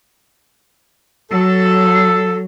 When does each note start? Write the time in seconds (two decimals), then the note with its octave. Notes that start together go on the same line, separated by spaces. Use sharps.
1.31 F#3 A4